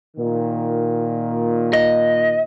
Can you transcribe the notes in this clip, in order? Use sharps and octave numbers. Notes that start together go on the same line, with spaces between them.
A#2 D#3
D#5